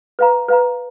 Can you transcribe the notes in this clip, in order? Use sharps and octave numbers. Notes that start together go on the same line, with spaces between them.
B4 F5 A#5
B4 F5 A#5